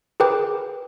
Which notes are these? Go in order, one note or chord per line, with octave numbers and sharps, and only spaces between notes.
G#4 A#4 B4 G5 D6